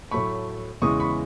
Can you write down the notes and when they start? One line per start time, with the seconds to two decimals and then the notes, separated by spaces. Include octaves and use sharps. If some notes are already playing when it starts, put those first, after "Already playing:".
0.11 A2 F#3 A3 B5 C#6
0.82 E2 C#3 E3 G#3 C#6 D#6
1.00 B5 C#6